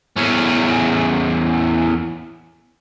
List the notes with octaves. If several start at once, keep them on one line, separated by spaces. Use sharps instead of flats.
E2 C#4